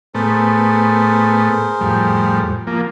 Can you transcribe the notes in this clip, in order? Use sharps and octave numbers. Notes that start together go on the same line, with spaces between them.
A2 A3 B3 G#4 A#4 C5
F2 A2 G3
F3 A#3